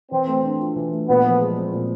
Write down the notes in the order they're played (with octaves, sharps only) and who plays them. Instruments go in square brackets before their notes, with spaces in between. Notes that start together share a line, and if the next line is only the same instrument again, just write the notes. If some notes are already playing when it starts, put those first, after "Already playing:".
[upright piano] E3 [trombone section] C4
[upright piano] A3
D4
F4
E3
A3
[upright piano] A#2 [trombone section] B3
[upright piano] F3
G#3
C4
A#2